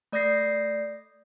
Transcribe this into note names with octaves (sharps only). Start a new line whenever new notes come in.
A3 D5 D#6 G6 A#6 C7